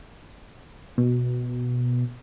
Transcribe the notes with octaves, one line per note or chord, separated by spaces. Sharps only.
B2